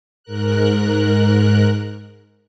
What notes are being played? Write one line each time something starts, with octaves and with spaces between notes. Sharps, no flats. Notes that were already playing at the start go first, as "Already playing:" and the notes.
G#2 A#4 F#6